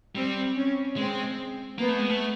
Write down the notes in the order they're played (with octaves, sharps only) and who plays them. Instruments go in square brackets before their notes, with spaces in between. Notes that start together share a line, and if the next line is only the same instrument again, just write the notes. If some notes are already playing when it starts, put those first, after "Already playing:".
[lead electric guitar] G3 [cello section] C4
[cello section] C#4
[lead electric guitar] G#3 [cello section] C4
[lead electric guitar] A#3 [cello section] B3
[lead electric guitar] A3
G#3
A3